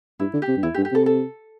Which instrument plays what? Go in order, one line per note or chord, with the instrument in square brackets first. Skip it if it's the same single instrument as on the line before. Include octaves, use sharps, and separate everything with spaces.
[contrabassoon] G2 [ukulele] E4
[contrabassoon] D3
[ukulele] G4
[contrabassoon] C3
G2
[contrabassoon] E2 [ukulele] E4
[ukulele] G4
[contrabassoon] G2
[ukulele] G4
[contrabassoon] C3 [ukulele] A4
[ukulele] A4